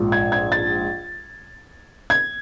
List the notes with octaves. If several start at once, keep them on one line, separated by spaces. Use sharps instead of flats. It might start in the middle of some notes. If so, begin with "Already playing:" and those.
Already playing: A#1 G#2 F3
G#6
G#6
A6
G#6